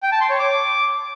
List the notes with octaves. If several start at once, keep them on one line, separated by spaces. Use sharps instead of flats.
G5
A5
C6
C#5
D6